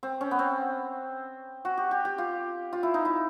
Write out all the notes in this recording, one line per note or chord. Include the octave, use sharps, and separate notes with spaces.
C4
C#4
B3
C4
F#4
G4
G4
G4
F4
F4
E4
D#4
E4